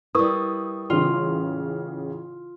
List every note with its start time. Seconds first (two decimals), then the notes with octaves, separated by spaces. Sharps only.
0.15 G3 E4 A#4 B4 C#6 D#6
0.90 A1 C#3 F4